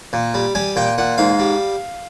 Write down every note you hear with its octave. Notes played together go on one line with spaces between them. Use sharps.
A#2
G3
G3 G#5
A#2 G5
A#2 F#5
G#2 F5
G3